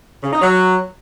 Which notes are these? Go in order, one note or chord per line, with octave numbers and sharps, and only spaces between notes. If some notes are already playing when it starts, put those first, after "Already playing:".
C#3
D#4
F#3